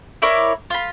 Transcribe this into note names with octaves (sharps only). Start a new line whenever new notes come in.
E4 A#4 C#5 D5
F4 B5